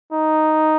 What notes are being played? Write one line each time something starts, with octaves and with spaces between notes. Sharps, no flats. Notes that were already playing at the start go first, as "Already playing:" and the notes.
D#4